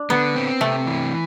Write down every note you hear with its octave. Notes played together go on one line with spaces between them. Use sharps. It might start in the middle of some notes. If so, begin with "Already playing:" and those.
Already playing: D4
D3 B3
C4
C3 A3
E3